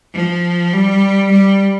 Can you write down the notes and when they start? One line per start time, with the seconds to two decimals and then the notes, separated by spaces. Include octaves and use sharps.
0.14 F3
0.73 G3
1.32 G3